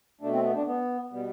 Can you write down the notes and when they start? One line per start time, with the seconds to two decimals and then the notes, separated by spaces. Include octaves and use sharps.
0.21 B2 A3 D4
0.32 C4
0.43 B3
0.55 D4
0.66 B3
1.11 B2 G3 B3